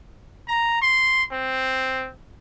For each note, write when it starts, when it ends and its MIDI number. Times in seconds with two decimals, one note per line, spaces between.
0.48 0.81 82
0.82 1.24 84
1.32 2.10 60